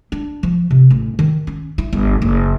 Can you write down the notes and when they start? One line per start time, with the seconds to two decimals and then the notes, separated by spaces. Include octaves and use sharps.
0.12 D4
0.43 F3
0.71 C3
0.90 A1
1.19 D#3
1.47 C#4
1.78 E4
1.93 G1
2.22 F#1